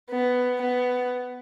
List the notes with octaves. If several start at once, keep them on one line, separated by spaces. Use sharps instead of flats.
B3
B3